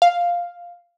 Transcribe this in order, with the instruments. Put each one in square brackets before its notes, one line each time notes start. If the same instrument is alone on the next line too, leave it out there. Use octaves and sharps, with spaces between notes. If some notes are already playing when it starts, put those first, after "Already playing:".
[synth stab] F5